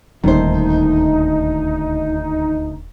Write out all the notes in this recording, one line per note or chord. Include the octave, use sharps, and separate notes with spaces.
D#1 D2 D#3 D#4 C5